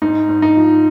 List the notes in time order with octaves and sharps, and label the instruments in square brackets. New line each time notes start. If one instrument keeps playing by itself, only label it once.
[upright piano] G#2 D#4
G#2
D#4
F3